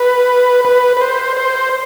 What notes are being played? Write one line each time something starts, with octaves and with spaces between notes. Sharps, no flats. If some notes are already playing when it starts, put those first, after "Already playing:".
Already playing: B4
B4
B4
C5
C5